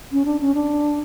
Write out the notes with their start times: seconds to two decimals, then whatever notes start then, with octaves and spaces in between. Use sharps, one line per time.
0.12 C#4
0.25 D4
0.41 C#4
0.55 D4